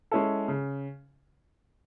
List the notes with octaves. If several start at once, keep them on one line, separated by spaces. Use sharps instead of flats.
G#3 C#4 E4 A4
C#3